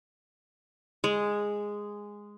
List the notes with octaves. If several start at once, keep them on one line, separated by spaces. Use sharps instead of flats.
G#3